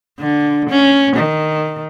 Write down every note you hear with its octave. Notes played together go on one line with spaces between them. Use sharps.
D3
C#4
D#3